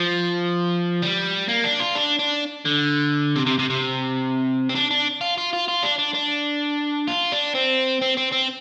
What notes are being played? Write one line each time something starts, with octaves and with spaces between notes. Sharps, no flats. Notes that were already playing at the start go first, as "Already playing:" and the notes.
Already playing: F3
G3
A#3
D4
F4
D4
D4
D3
C3
C3
C3
C3
C4
D4
D4
F4
F4
F4
F4
D4
D4
D4
F4
D4
C4
C4
C4
C4